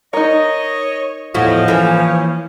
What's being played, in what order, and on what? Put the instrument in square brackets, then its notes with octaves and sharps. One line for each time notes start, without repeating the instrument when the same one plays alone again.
[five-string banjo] D#4 A#4 [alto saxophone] C#5 [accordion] D#5
[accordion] E2 D#5 [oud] A2 E4 F#4 [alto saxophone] F3
[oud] E3 A#3 [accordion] C#4